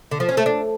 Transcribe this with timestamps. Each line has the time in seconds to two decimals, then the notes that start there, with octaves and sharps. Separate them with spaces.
0.11 D3
0.20 F3
0.29 C#4
0.37 A3
0.46 D4